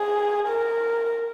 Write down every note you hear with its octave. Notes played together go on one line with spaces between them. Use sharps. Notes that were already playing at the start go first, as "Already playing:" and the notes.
Already playing: G#4
A#4